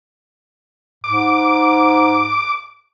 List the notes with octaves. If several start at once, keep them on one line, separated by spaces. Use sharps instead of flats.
G#2 D6